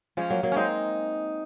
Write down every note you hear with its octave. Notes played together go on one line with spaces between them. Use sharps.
F3 G#3 C#4
F#3 A#3
F#3 A#3
C#4
G#3 C4 D#4